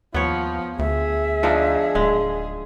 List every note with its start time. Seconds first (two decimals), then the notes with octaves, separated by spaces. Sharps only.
0.14 D#2 F3 B3 C#5
0.79 D2 G#4 E5
1.43 F3 D4 D#4
1.95 D1 G#3